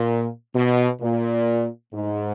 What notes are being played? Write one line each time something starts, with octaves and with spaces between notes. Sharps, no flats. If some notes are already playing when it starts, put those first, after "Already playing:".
Already playing: A#2
B2
A#2
G#2